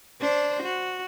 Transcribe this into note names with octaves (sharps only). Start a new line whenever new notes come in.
D4 C5
F#4